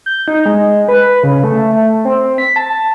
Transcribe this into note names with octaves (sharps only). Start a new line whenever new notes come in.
G6
D#4
G#3
B4
C#3
A3
A3
C4
B6
A5